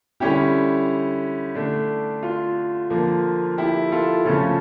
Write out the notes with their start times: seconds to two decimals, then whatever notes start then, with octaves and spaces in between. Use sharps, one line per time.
0.20 D3 G3 C#4 E4 G4
1.55 D3 A3 D4
2.23 F4
2.90 D3 F3 A#3
3.58 E4 G4
3.91 F4 A4
4.25 C#3 F3 A3 C#4 F4 A4